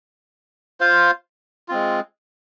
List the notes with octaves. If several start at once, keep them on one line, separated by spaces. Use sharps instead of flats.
F4 C5 F5
G#3 C4 F4